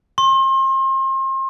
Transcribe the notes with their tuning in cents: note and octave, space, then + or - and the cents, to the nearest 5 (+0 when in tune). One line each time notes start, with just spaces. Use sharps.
C6 +35